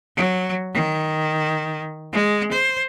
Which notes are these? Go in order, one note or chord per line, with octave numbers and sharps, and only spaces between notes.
F#3
D#3
G#3
C5